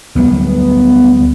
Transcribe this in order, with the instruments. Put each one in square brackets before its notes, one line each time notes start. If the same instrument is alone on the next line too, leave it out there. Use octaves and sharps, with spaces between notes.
[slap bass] D2 F#3 G3 [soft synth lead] B3